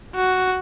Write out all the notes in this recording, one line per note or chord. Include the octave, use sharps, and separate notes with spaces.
F#4